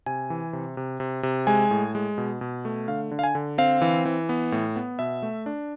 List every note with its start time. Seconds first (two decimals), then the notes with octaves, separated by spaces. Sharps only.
0.06 C3 G#5
0.30 E3
0.53 C3
0.77 C3
1.00 C3
1.23 C3
1.47 G#3 G#5
1.71 A2
1.95 G#3
2.18 B2
2.41 B2
2.65 A3
2.88 D3 F5
3.11 D3
3.19 F5
3.24 G#5
3.35 D3
3.58 C4 F5
3.82 E3
4.05 E3
4.29 B3
4.52 A2
4.76 B3
4.99 B2 E5
5.23 A3
5.46 D4